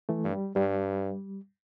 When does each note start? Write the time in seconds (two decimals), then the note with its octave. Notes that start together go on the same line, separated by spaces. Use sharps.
0.09 E3 A3
0.24 G2
0.33 G3
0.56 G2 G3